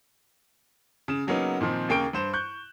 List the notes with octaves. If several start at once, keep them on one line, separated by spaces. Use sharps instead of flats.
C#3 E7
C#3 F#3 A#3 B3 C#4 D#4
A#2 D#3 F3 C4
D#2 C#3 A#3 G5 C#6 D7
G2 C5 E7
C#6 F#6 G6